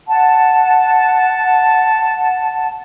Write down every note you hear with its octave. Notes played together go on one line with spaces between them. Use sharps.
F#5 A5